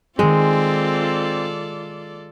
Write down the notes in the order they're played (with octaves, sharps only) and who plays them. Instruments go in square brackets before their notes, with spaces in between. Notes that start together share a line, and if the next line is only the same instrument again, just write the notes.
[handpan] D#3 G#4 [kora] G#3 [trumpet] C4 [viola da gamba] F4 A4 D5